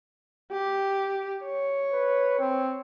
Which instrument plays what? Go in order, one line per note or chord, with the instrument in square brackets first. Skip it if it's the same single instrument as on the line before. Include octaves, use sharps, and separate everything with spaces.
[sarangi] G4
C#5
[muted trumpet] B4
C4